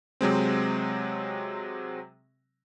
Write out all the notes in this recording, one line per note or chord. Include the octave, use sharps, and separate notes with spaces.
C3 F#3 G#3 C4